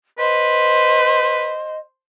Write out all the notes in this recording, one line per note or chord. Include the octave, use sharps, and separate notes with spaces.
B4 C5 D#5